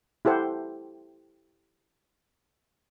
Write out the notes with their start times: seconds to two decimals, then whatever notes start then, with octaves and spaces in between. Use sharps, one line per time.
0.25 E4 G4 A4 C5 F#5